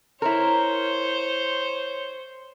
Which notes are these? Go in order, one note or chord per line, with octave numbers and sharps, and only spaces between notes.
E4 A#4 C5 C#5